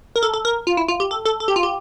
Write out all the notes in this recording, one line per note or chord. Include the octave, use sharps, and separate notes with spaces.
A#4
A4
A4
A#4
F4
E4
F4
G4
A4
A4
A4
G4
F4
G4